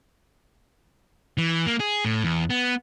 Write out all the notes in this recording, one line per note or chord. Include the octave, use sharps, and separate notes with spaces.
E3
A#3
G#4
A2
E2
B3